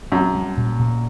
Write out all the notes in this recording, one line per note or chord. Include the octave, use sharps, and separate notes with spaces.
F#2 C4
G3
A#2
A#2